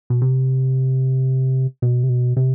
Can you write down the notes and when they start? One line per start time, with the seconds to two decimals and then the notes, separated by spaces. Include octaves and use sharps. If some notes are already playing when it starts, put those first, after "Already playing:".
0.10 B2
0.22 C3
1.82 B2
2.04 C3
2.09 B2
2.37 C3